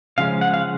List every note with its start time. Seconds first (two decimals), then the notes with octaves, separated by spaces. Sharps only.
0.18 C#3 F3 G#3 C#4 F5
0.41 F#5
0.54 F5